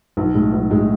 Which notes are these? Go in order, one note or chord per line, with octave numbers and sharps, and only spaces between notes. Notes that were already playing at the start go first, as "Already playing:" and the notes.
B1
A2 G#3
B1
A2 G#3